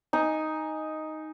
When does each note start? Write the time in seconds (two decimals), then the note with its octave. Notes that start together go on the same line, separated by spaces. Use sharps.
0.13 D#4 G#5